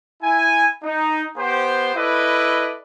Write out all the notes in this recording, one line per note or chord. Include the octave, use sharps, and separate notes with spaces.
E4 G#5
D#4
B3 G4 C5
E4 A4 B4 D5 D#5